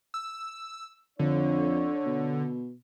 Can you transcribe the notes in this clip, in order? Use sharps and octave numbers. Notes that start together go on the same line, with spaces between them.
E6
F2 D3 D4 C#5
B2